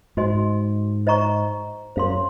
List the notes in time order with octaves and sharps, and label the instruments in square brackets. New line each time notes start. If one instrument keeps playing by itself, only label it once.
[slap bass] G#2 [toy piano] F#4 C5 D#5 G#5 C6
[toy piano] C5 D#5 A#5 C#6
[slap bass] F#2 [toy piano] C5 F5 C6